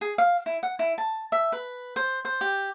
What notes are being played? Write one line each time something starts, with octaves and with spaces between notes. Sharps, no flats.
G#4
F5
E4
F#5
E4
A5
E5
B4
C5
C5
G4